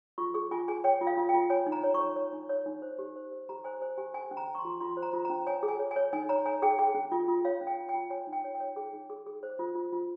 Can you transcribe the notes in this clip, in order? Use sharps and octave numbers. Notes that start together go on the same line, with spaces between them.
F4 C#6
G#4 C#6
F4 G#5
G#4 G#5
C#5 G5
F4
F5
F4
G5
F4
C#5 G#5
D#4
A#5
C#5
C#6
C#5
C#5
D#4
C#5
D#4
C5
G4
C5
C5
G4 A#5
C5 G#5
C5 G#5
G4 G#5
C#4 G#5
C#4
A#5
C#4
C#6
C6
F4
F4 C6
C5
A#5
F4
C#4 A#5
C#5 G#5
G#4
G#5
C#5
G#5
C#5
D#4 G#5
C#5 A#5
C#5 G#5
G#4 G5
G#4 G5
C#4
F4
F4
C#5 F5
C#4
G5
F4
G5
F4
C#5 G#5
D#4
G5
C#5
G5
C#5
G#4 G5
D#4
G#4
G#4
C5
F4
F4
F4